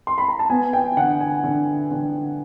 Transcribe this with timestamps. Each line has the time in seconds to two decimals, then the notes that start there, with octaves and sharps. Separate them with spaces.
0.07 C6
0.18 B5
0.28 A#5
0.39 A5
0.50 B3 G#5
0.73 G5
0.97 D3 F#5
1.21 G#5
1.44 D3
1.91 D3